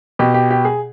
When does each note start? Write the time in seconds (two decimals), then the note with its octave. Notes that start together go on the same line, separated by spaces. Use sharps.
0.19 B2 G4
0.34 G4
0.51 G4
0.65 G#4